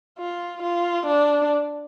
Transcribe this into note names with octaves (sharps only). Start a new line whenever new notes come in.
F4
F4
D4